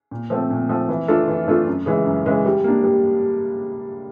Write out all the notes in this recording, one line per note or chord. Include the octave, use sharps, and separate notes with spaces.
A#2
F3 A3 C4
A#2
F3 A3 C4
E3
A3 D4 F4 A4
E3
A3 D4 F4 A4
F#2
C#3 E3 G#3
F#2
C#3 E3 G#3
G3
A#3 D4
G3